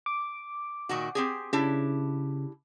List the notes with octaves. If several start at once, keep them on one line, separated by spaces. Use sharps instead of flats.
D6
A#2 D#3 F#4
C4 G4 G#4
C#3 D4 E4 G4